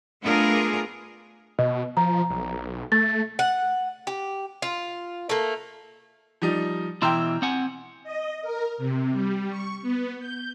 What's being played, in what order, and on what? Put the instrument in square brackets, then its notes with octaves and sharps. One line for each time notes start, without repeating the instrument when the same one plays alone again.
[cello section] A3 B3 D4 F4 G#4 A#4
[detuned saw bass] B2 [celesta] D#5
[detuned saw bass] F3 [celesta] A#5
[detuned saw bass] B1
[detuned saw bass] A3 [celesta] A6
[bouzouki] F#5
G4
F4
A3 A#3
[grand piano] F3 G3 D#4
[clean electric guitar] B2 E3 E5 [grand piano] G5 A#5 C6
[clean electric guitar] C4 F#5 G#5
[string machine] D#5
A#4
C3
G3
C#6
B3
G6